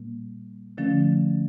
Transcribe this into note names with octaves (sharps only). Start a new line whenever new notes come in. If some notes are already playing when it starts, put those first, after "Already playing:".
Already playing: A#2 G3 A#3
D3 F3 A3 C#4